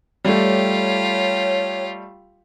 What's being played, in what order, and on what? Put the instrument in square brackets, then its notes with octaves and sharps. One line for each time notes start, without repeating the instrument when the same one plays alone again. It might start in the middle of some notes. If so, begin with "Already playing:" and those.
[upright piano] G3 A3 [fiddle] F4 G4 [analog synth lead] C#5